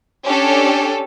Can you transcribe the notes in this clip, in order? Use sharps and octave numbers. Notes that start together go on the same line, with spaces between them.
C#4 D4 G4 A4